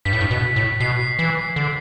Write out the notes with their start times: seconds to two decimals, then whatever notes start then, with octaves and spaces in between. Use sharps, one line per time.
0.05 G2 B6
0.13 A2
0.21 G2
0.31 B2
0.56 A2
0.80 B2 C7
1.19 E3
1.56 D3